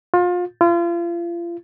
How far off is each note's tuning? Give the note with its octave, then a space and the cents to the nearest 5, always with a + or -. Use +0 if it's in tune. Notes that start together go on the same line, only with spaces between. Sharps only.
F4 +30
F4 -35